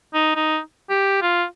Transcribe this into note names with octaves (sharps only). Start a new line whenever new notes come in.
D#4
D#4
G4
F4